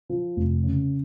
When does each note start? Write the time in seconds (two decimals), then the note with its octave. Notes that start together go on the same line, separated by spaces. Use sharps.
0.09 F3
0.37 F1
0.64 C#3